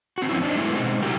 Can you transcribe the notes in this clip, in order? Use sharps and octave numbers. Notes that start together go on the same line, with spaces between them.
C4 F#4
F3 G3 C4 C#4 E4
C4 D4 D#4
F#3 G#3 A3 B3 D#4 E4
B2 G#3 C4 D#4
C3 F#3 E4 F#4 G4 A#4